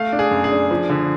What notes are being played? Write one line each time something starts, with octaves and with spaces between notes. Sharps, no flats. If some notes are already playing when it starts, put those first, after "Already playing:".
Already playing: A3 F5
D4
G#4
F#2
G#4
D4
F3
D3